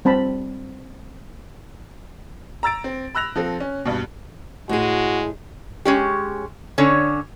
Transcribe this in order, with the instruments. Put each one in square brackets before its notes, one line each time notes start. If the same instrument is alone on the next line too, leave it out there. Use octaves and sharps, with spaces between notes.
[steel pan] G3 C4 A5 B5
[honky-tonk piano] A#5 E6 A6 D7
C4
B5 E6 F#6 A#6 F7
F3 C4 A4
C#4
G2 B2
[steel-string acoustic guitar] A2 G#4 [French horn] G#3 [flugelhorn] F#4
[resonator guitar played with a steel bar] G#3 C#4 G4
D3 C#4 C#5